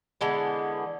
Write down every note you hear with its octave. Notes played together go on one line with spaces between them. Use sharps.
D3 E3 G#3 B3